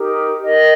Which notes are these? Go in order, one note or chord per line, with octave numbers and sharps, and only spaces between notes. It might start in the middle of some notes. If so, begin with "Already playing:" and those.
Already playing: D#4 G4 A#4
D#4 A#4 D#5